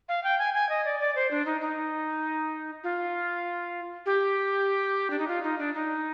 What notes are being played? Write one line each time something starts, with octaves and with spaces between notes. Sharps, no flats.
F5
G5
G#5
G#5
D#5
D5
D5
C5
D4
D#4
D#4
F4
G4
D4
D#4
F4
D#4
D4
D#4